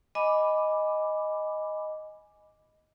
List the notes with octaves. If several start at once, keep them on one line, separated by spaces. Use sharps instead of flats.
D#5 G#5 B5 D6